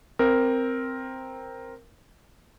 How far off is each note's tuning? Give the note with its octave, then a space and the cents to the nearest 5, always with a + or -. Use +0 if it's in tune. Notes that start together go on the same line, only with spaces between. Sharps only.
C4 +0 A#4 +0